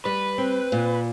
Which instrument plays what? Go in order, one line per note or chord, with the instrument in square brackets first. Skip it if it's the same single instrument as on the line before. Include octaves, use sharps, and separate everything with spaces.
[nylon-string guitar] G3 [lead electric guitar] B4
[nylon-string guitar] C4
A#2